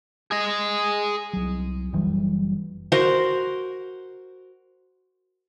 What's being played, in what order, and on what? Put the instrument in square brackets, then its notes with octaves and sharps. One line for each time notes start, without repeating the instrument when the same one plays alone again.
[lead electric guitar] G#4 D#5
[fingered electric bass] C2 F#3
F#1 E3 F#3 G3
[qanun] F#4 A#4 C5